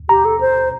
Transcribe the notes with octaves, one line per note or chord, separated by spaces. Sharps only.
G4 A#5
A4
C5